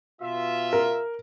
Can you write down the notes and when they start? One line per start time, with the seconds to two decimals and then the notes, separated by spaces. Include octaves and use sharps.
0.22 B2 F4 E5
0.73 A#4